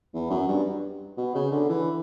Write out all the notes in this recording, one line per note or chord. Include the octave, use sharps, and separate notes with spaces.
E2
F#2
G2
B2
C#3
D3
E3